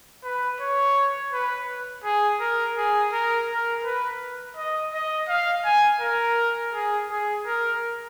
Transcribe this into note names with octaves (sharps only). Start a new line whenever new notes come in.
B4
C#5
B4
G#4
A#4
G#4
A#4
A#4
B4
D#5
D#5
F5
G#5
A#4
G#4
G#4
A#4